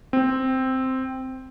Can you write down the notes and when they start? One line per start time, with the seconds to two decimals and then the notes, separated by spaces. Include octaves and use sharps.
0.13 C4